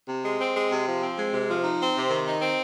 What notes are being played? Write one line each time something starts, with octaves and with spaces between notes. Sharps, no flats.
C3
G#3
C4
G#3
C3
F3
C4
G#3
C3
F3
D#4
C4
C3
D#3
D#4
C4